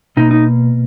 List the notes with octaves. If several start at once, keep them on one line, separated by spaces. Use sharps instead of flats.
B2 A#3 D#4
D#4